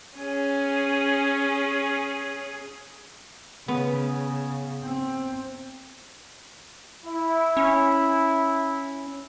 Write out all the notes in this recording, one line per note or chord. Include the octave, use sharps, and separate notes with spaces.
C#4 G#4
C#3 B3
C4
E4
C#4